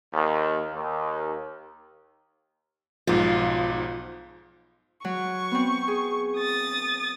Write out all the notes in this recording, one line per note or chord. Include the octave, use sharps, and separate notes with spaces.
D#2
D#2
B1 G#2 F3 F4
F#3 C#6
B3 C4
G#4
D#6 A6